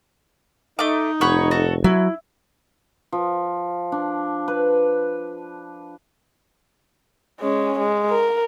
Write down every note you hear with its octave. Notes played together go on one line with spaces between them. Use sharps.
A3 D#4 D6
F1 C#5 F#5 B5
F#4 A4
F#3 E4
F3
D4
B4
G#3 C#4
G#3
A#4